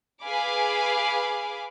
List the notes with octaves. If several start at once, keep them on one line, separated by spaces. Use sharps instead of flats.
G#4 B4 F5 G#5 B5 D6